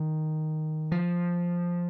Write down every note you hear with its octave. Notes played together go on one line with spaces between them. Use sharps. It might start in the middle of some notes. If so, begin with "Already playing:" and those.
Already playing: D#3
F3